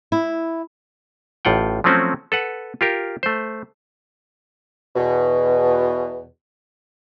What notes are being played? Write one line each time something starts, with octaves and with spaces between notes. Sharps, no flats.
E4
A1 A2 F4 F#5 G5
F3 F#3 A3 C4 C#4 F#4
A4 B4 F#5
F4 G4 A#4
A3 C5
E2 B2